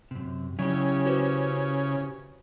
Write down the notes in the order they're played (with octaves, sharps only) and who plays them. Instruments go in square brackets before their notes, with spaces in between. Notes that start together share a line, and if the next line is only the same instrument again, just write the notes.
[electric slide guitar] F#2 C3
[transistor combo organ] C#3 [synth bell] F#3 [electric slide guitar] C#4 E4 G4
[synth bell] F#4 B4 C5